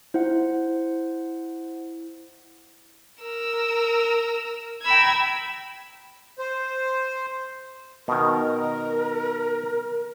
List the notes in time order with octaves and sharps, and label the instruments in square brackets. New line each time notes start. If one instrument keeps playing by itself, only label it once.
[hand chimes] E4 [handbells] C5 F#5
[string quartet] A#4 E6
G5 A#5 B5 E6 G#6
[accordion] C5
[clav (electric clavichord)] B2 D#3 [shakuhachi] A#4